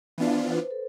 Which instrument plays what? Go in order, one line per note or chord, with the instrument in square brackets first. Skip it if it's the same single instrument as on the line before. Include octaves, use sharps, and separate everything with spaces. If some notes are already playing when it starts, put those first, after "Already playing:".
[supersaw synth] E3 B3 D4 F4 [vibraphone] B4
[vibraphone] C5
C5
A4